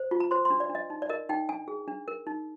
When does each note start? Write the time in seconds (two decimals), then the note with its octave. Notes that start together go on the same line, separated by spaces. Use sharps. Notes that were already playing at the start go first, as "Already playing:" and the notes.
Already playing: C5
0.11 F4
0.20 A#5
0.31 C5 C6
0.45 C6
0.50 D4
0.60 D5
0.70 D4
0.75 D#5
0.90 D#4
1.02 D5
1.09 A#4 D#5
1.29 D#4 G5
1.49 D4 G#5
1.68 G#4
1.88 D4
2.08 A#4
2.27 D#4